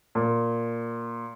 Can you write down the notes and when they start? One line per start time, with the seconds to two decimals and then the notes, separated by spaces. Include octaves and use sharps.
0.15 A#2